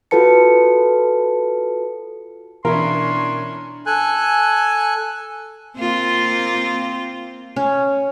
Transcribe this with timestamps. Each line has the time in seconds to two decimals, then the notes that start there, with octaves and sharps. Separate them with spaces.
0.11 F4 F#4 A4 B4 A5 C#7
2.65 B2 E3 C#4 D4 E4 A#4 C6
3.86 A4 G#5 F#6
5.77 A#3 C4 F4
7.56 C#4